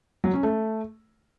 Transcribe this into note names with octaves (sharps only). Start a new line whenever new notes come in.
F#3
C#4
A3